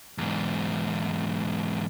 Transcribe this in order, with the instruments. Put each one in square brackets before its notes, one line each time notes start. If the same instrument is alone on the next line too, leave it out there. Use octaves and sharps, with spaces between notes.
[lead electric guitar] E2 G#2